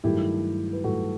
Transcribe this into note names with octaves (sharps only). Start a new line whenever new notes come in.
G2 D#3 F#3 A3 E4 G4
B4
G2 D#3 F#3 A3 F#4 A4